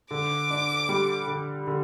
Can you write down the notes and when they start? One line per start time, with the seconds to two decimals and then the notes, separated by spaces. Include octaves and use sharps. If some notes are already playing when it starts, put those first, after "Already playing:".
0.11 D3 D6
0.51 D4
0.89 G3
1.28 D3
1.67 D3